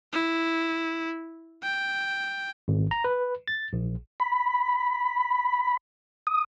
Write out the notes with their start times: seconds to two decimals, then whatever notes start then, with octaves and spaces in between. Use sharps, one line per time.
0.13 E4
1.63 G5
2.68 G#1
2.91 A#5
3.04 B4
3.48 A6
3.73 A#1
4.20 B5
6.27 D#6